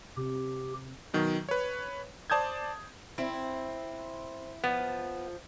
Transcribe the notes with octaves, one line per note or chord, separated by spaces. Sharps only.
C3 G4
B2 D#3 F#3
B4 C#5
C5 D5 A5 D#6 G6 G#6
C4 E4
F3 B3